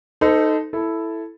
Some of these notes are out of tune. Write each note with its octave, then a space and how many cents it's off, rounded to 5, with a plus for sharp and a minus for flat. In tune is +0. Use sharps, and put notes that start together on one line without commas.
D#4 +0 A4 +0 C5 -40
E4 +0 A4 +0